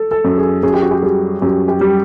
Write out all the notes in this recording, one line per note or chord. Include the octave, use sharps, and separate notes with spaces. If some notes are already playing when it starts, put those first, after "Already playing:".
Already playing: A4
A4
F#2
G#4
F#2 G#4
G4
F#4
G4
G3 G#4
F#2 G4
G4
G3